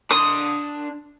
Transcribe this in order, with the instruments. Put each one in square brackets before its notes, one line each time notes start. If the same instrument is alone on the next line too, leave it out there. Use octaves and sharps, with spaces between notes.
[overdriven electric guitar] D4 C6 [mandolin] D#6